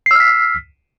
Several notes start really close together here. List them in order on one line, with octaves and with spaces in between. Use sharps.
C7 E6 F6 B6